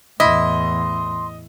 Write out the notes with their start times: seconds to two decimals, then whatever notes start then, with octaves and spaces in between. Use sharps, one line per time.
0.20 E2 A2 E4 D#5 C6